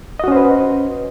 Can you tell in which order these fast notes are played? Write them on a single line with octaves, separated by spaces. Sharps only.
D#5 F#4 C#4 C5 B4